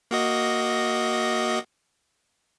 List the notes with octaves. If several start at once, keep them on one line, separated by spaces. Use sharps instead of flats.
A#3 F#4 D#5